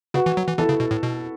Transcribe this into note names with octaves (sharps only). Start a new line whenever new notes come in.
C#3 F#4 B4
E3
F#3
E3
E3 E4 A4
C#3
B2
A2
B2